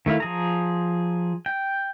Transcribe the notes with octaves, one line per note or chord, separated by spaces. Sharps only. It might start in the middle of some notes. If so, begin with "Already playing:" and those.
D#3 A3 E4 F5
F3 G#4 A#5
G5